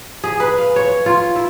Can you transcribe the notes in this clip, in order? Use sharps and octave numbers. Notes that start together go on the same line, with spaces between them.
G#4
B4
F5
C#5
F4
E4